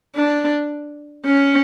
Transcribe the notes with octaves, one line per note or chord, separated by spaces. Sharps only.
D4
C#4